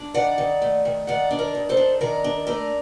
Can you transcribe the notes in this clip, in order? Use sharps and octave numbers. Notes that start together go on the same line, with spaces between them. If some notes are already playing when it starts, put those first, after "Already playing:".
Already playing: D4
D#3 D5 F#5
D#3
A3
D#3
D#3 D5 F#5
D4
A#4 D5
D#3
A4 C5
D4
D#3 A#4 D5
D4
A3 A#4 D5